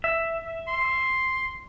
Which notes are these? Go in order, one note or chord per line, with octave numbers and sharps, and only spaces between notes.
E5
C6